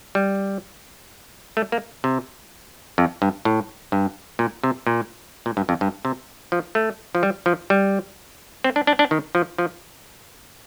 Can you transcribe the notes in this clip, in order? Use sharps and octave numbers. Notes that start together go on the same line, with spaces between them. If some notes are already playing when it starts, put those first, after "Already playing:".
G3
A3
A#3
C3
F2
G2
A2
G2
A#2
C3
A#2
A#2
G2
F2
G2
C3
F3
A3
F3
G3
F3
G3
C4
D4
D4
D4
D#3
F3
F3